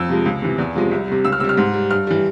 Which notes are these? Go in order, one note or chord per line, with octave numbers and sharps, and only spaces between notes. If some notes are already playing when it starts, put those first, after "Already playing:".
Already playing: F2 E6
C3 F3 G#3
C#2
C3 E3
E2
C3 F3 G#3
C2
C3 G3
C#2 E6
F6
C3 G3 E6
F6
G#2
G3
G2 F6
E3 G3